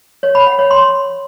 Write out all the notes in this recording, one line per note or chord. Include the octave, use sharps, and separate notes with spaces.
C#5
B5
F#5
C#5
C6